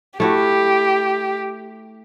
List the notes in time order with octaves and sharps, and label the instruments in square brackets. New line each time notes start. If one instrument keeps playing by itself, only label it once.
[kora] A3 E4 F#4 [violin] G4